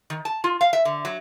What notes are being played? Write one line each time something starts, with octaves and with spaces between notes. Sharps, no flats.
D#3
A5
F4
F5
E5
D3
F#3